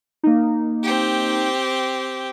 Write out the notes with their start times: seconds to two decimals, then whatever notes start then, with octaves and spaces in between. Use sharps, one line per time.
0.23 A#3 D#4
0.83 C4 G4